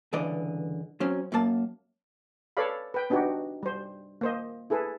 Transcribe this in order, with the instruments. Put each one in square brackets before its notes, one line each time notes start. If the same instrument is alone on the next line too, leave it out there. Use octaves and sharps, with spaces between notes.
[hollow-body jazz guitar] C#2 G2 D3 E3 D5 D#5
F#3 C4 C#4
F#2 F#3 A#3 A5
[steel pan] A4 B4 C#5 D5 F5 B5
B4 G5
B3 D4 D#4 F#4 G4
G3 C5
A#3 C5 D#5
E4 G#4 A4 B4